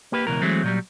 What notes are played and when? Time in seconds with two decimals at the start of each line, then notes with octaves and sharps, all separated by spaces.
0.12 A#3 G4 B4
0.27 C#2 F#2 B2 E3 A#4
0.42 E3 F#3 G#3 A3 C4
0.63 A#2 F#3 G3